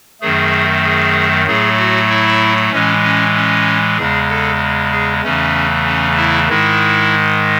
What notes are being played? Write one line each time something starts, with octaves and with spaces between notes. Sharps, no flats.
F#2 D#3 F#3 A3 G#4
G#4
A2 F#3 A3 G#4
F#4
E4
A2 E3 G#3 C#4
C#4
C#4
E2 C#3 G#3 G#4
A4
G#4
E2 C#3 E3 A3 C#4
C#4
E4
G#2 D#3 G#3 E4